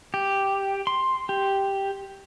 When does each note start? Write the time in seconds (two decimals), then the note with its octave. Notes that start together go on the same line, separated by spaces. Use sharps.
0.14 G4
0.87 C6
1.29 G4